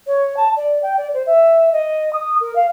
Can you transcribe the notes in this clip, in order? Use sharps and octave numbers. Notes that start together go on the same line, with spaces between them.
C#5
A5
D5
G5
D5
C5
E5
D#5
D#6
A#4
F5